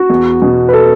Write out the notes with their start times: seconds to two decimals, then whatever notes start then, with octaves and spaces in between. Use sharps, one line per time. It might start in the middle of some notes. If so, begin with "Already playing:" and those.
Already playing: F#4
0.10 E2
0.42 B2
0.69 B4
0.73 A4